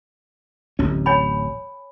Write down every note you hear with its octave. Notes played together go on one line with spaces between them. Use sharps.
D1 A1 C#4
C#5 G#5 B5